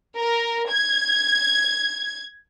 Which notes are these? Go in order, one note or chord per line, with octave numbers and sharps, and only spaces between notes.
A#4
G#6